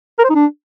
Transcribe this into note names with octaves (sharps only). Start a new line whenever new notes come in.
A#4
C5
D#4
D4